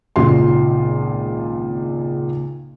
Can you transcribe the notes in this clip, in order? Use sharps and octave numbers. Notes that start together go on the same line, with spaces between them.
G#1 C#2 A#2 F4 C6